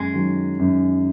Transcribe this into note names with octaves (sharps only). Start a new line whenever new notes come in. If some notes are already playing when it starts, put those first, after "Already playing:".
Already playing: F#2 G#3
D#3 F#3
F#2